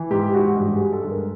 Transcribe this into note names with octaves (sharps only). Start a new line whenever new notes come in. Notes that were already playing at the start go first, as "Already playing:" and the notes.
Already playing: E3
G#2 G4
G#2 F#4
G2 G4
G#4
G#3
A4
G2
A#4